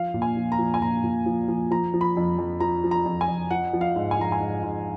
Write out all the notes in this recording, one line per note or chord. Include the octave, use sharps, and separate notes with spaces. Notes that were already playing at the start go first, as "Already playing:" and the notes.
Already playing: F3 F5
A#2
G#5
F3
A#5
F3
G#5
A#2 A#5
A#2
F3
F3
F3 A#5
F3
B5
F2
F2
F3 A#5
F3
A#5
F2
G#5
F2
F3 F#5
F3
F5
G#2
G#5
F3 A#5
G#5
G#2
G#2